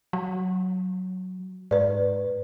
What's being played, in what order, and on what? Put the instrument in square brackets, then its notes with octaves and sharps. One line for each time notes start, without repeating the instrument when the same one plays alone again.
[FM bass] F#3
[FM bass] G#2 [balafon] B4 D5